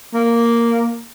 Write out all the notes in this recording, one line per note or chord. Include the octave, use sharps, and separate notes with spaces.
A#3